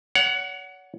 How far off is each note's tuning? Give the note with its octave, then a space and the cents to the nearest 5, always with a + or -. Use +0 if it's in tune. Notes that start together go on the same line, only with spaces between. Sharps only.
C#5 +35 F#5 +5